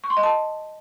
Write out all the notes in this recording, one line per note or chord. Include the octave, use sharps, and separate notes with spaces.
C#6
C6
D#5
A5